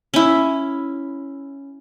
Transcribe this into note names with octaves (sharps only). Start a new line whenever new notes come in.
C#4 E4